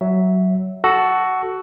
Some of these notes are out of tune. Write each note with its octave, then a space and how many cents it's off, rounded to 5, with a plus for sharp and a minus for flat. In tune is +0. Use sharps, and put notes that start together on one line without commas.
F#3 +15 E5 +0
F#4 +10 A4 +0